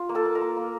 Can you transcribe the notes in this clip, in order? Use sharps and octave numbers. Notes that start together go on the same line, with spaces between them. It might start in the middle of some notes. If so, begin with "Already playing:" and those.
Already playing: F4
A#3
A4 A5
A#3
A#4 A#5
A#3
A#3